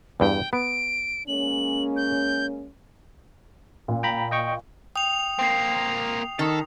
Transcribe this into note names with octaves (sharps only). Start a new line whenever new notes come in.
E2 G2 G5
B3 D7
G#3 A#3 C#4 F#7
G6
A#2
G5 A#5 B5
D#5 G5 C#6
G5 D#6 F7
A#3 C4 G5 C7
D#3 A4